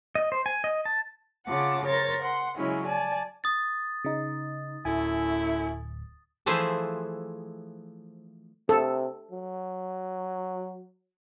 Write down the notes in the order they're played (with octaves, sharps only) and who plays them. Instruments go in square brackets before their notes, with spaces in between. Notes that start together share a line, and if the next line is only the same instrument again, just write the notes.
[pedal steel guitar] D#5
C5
G#5
D#5
A5
[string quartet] C#3 F4 F#5 A5 D6
A#4 C5 C#5 A6
F#5 C6
C#3 F#3 G#3 C#4 E4
D5 G#5 A5
[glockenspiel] D#6 A6
[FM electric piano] C#3 D#4
[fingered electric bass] D1 [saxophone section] F#2 A3 E4 [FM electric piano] G#5
[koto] E3 F3 A3 G#4 C5 A5
[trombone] C3 [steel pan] A4
[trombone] F#3